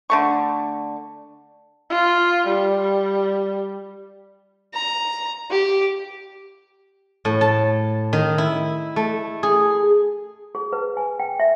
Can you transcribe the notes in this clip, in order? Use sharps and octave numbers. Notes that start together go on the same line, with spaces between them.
D3 A3 C#6
F4
G3
A#5
G4
A2
A5
D#3
E4
A3
G#4
G#4
B4
G#5
G5
E5